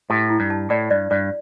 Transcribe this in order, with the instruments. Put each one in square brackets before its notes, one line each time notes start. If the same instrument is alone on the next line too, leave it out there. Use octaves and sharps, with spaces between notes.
[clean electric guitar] A2 [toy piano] G4
[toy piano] E4
[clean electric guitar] G2
[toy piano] A5
[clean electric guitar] A2 [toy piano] D5
[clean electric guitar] G2 [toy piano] D5
[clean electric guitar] G2 [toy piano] D5